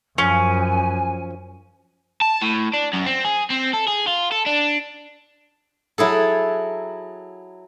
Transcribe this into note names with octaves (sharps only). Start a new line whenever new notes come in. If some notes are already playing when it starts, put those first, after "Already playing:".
F#2 F3 C#4 G#5
A5
A2
D4
F#2
C4
G#4
C4
A4
G#4
F4
A4
D4
F#3 E4 G#4 A4